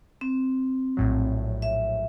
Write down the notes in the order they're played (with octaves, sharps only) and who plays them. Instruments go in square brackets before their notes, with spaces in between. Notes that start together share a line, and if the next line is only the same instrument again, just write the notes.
[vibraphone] C4
[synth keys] A#1 A2 F#3
[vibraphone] E5